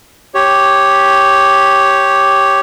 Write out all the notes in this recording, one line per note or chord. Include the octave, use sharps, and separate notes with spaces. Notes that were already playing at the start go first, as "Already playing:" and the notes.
G4 C#5